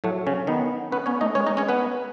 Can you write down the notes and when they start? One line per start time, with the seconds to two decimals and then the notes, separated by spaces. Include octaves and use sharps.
0.04 A2 F#3 A3
0.27 C#3 C#4
0.47 D#3 B3 D#4
0.91 B3 C#4 B4
1.06 B3 C#4 C#5
1.21 A3 D#4 D#5
1.35 G#3 C#4 C#5
1.47 D#4 D#5
1.57 C#4 C#5
1.69 B3 B4